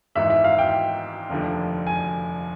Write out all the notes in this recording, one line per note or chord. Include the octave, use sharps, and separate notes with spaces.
G#1 G#2 E3 E5
E5
F5
G5
F1 D#2 D3 F3
G#5